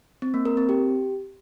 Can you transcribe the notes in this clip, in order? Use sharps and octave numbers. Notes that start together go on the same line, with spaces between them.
C4
A#3
A#4
C4
G4